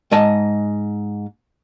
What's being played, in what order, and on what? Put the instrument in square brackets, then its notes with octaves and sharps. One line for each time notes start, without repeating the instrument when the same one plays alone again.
[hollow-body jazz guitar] G#2 G#3 D#5 A5